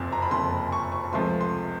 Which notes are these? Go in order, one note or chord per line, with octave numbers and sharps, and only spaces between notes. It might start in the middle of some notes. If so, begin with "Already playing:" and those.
Already playing: F#1 F2 C3 C6
A#5
B5
F#1 F2 C3 C6
C#6
C#6
C#2 C3 F3 A3 C6
C6